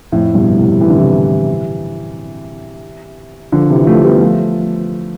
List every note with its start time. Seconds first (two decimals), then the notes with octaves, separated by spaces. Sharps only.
0.12 F2 A2
0.35 G2 B2
0.58 A2 C3
0.81 E3
0.89 D3
0.98 C3 E3
3.52 D3 F3
3.70 C3 E3
3.87 F3 A3
4.04 G3 B3
4.21 F3 A3